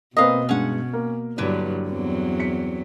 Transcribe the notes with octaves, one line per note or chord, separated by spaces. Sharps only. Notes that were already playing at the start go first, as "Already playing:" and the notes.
B2 A#3 C4 B4 D#5 F5
G2 G#3 C#4 F#5
A#3
G2 D3 F#3 E4 B4
E2 F#3 C4
B6 C#7